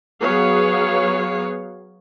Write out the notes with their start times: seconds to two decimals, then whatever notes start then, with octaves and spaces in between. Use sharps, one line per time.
0.21 F#3 B3 G#4 C#5 F5